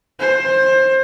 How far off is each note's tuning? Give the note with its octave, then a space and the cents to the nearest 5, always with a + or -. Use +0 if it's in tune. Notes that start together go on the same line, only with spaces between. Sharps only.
C5 +20